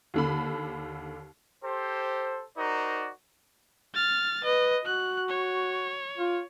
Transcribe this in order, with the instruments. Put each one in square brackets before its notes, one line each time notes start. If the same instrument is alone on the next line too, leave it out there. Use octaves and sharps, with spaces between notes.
[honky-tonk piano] D#2 D3 B5
[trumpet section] G4 A4 C5
D#4 F#4 A#4 C5 D5
[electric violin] F6 A6
[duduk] B4 [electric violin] D#5
[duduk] F#4 [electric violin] F#6
[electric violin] C#5
[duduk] F4